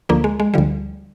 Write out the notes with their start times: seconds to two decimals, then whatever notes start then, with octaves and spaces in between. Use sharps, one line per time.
0.09 D2 D3 F3 A#3
0.24 G#3
0.40 G#3
0.54 D2 D3 F3 G3